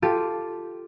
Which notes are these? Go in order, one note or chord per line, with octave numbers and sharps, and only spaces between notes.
F4 G4 A4 A6 D#7